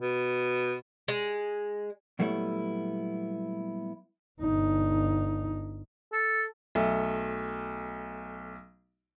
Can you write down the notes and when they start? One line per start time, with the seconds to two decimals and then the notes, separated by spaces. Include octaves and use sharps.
0.01 B2
1.08 G#3
2.19 A#2 F#3 G3 A3 B3 E4
4.42 G1 D#4
6.12 A4
6.75 B1 A3